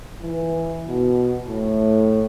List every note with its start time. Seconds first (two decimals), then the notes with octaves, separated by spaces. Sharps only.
0.22 E3
0.88 B2
1.48 A2